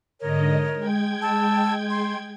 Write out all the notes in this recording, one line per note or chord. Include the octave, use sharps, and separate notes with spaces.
G#2 D3 A#4 C#5 D#5
G#3 G5 G#6
A5 E6
C6